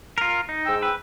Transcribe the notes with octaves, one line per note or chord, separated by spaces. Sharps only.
F4 A#4
D#4
G#2 G5 E6
B4